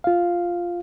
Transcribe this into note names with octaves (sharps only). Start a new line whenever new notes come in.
F4 F5